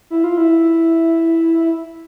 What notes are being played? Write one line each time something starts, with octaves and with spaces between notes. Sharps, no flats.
E4
F4
E4